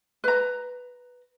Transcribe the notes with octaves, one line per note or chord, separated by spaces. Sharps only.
B4 A#5